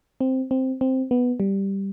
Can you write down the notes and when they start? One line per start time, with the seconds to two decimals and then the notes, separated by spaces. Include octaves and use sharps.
0.21 C4
0.51 C4
0.81 C4
1.11 B3
1.40 G3